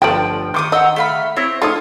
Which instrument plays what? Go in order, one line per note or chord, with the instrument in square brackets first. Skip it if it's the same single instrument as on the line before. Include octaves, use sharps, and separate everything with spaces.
[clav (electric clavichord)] G1 F3 D5 [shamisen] A3 B3 G5
[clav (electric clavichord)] D#3 [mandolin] C6 D6 D#6
[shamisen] D#5 [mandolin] F#5 G5 E6
[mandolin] A3 F5 B5
[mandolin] C4 C#5 [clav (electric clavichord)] E4
[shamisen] A3 D#4 [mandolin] F4 C#5 D#6